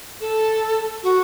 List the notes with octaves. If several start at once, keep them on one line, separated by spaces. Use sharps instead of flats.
A4
F#4